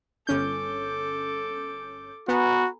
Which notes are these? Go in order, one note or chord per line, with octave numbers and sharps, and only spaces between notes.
G1 C#4 A4 D6 G6
B3 F#4 G#5 A#5 B5